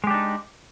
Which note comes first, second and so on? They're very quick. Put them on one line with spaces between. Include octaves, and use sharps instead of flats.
G#3 G4 D4 D#4